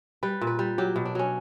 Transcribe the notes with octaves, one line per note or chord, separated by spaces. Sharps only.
G3 B4
A#2
B4
G3
F#3 G4
B2
D4
F#3 C#4